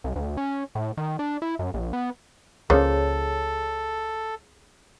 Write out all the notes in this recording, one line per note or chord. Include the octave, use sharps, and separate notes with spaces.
C2
D2
C#4
A2
D#3
D4
E4
F#2
A#1
B3
C#2 F3 G3 A#3 C#4 G#4 A4 C#5